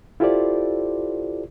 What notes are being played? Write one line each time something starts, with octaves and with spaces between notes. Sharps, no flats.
E4 F4 G4 A4 C5 D5